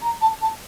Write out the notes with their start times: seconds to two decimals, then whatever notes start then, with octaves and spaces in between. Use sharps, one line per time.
0.02 A#5
0.21 A5
0.41 A5